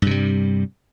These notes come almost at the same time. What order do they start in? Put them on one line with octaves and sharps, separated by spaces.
G2 C3 G3